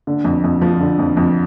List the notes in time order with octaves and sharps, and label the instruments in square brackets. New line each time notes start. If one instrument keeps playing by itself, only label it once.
[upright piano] D3
F2
F2
F3
D3
F2
F2